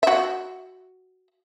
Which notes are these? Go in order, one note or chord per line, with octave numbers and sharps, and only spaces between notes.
F#4 E5